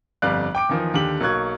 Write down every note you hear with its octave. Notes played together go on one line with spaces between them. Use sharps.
G1 F2 G3 D5 F5 F#6
G5 D6 D7
E2 D#3 F3
D#2 D3 G4 F#7
B1 F#3 A#3 C#6 F#6 G#6